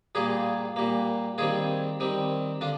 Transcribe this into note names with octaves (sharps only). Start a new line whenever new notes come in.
A#2 G3 A#3 F4 G#4
A#2 G3 A#3
D#3 G3 C4 F4 G#4
D#3 G3 C4
D3 D4 F4